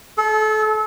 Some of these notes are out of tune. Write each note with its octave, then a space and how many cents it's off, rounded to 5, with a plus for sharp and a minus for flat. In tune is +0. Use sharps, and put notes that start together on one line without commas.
A4 -30